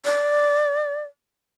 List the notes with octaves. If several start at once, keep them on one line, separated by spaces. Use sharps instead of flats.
D5